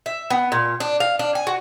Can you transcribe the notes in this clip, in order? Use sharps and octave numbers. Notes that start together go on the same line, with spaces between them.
E5
B3
A#2
D4
F5
D4
G#5
F#4